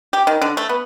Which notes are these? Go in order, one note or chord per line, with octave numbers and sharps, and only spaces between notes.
G4
D#3
D3
A3
B3